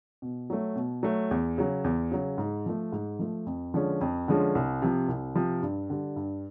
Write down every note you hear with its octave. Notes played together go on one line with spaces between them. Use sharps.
B2
F#3 A3
B2
F#3 A3
E2
C#3 F#3
E2
C#3 F#3
G#2
F3 A3
G#2
F3 A3
F2
D3 F3 G#3 C#4
F2
D3 F3 G#3 C#4
C2
C3 F3
C2
C3 F3
G2
D3 G3
G2